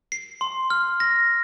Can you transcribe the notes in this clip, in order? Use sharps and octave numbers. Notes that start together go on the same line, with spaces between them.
C7
C6
F6
A#6